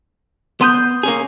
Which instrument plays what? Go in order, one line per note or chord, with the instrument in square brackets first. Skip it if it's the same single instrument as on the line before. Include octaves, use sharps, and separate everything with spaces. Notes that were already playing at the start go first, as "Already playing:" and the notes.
[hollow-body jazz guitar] B3 [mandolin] C6 D#6 G6
[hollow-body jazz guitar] A#3 C#4 G#4